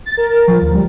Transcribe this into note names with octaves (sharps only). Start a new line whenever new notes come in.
A6
A#4
F3
D2
G3